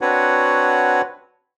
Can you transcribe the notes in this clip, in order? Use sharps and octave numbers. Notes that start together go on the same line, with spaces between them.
C4 D4 F#4 B4 C#5 F#5